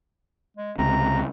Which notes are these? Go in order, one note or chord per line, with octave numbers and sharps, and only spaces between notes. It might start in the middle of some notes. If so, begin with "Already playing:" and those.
G#3
C#2 C3 A#5